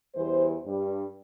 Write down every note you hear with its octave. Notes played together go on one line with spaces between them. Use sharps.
E2 E3 G3 C5
G2 G3